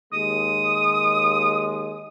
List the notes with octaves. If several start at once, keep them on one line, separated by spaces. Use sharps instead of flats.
D#2 G#3 D#6